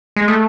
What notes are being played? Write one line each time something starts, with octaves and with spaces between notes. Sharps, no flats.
G#3
A3